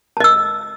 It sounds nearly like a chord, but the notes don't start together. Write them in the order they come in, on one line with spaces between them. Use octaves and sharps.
A5 D#5 E6